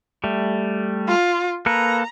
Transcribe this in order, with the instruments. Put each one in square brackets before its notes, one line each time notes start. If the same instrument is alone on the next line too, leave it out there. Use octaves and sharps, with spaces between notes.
[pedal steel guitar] G3 A3
[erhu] F4
[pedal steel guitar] A#3 A4 B4 [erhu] A#5